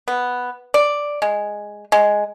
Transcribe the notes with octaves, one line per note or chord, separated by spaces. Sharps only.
B3
D5
G#3
G#3